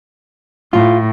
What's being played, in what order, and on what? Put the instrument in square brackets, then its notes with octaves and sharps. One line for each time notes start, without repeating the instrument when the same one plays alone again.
[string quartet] A2 [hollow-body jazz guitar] F4